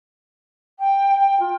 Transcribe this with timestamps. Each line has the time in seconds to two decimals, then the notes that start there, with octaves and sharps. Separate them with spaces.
0.79 G5
1.19 G5
1.39 F4